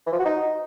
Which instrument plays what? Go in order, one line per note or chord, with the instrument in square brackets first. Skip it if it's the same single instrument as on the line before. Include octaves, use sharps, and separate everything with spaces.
[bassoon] E3
F3
F#4
D#4